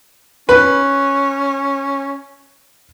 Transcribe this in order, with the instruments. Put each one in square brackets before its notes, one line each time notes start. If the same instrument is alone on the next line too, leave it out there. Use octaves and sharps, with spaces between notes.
[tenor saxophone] C#4 [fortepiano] B4